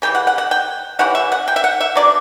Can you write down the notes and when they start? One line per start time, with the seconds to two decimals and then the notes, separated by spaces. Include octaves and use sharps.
0.02 C#3 E3 G3 G5
0.15 F#5
0.27 F#5
0.38 F#5
0.51 G5
0.99 E3 G3 C#4 E4 F#5
1.15 E5
1.32 F#5
1.48 G5
1.56 E5
1.64 F#5
1.81 E5
1.95 F#3 B3 D4 D5